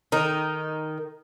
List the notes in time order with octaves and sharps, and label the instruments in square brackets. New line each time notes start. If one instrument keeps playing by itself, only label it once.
[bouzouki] D#3 D#4